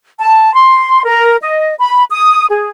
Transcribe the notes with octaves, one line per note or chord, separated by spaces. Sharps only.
A5
C6
A#4
D#5
B5
D#6
G#4